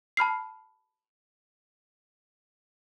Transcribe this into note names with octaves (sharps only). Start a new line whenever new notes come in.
A5 B5 F6 C7